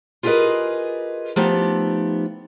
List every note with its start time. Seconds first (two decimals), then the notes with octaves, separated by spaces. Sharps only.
0.23 F4 G4 G#4 A#4 B4 D#5
1.36 F3 A3 B3 D#4 G4